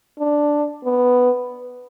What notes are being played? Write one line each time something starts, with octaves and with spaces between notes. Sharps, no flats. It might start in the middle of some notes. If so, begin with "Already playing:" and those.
D4
B3